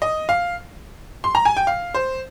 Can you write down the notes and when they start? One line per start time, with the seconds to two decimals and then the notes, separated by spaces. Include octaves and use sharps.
0.02 D#5
0.29 F5
1.24 C6
1.35 A#5
1.45 G#5
1.57 G5
1.67 F5
1.94 C5